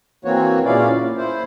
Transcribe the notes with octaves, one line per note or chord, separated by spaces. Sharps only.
E3 A#3 C4 F#4 C#5
A#2 C#3 C#4 E4 D5 F5
A#2
E4 C5